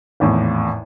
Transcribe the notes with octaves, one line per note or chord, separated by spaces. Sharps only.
G#1 E2 A2